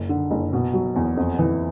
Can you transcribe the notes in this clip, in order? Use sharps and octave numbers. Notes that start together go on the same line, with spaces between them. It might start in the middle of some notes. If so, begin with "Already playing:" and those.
Already playing: F#1
D3
F#1
B2
F#3
E2
F2
E3